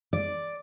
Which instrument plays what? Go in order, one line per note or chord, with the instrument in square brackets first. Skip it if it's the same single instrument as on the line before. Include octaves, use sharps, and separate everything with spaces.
[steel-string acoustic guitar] D5